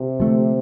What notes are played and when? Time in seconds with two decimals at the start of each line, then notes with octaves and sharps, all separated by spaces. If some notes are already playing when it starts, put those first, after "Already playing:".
Already playing: C3
0.19 D3 F3 A3